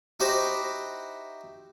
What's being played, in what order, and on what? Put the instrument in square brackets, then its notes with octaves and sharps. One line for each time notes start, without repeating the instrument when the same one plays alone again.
[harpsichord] D#4 E4 F#4 G4 C5